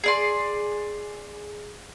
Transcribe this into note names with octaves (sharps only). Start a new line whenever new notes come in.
G#4 D5 C6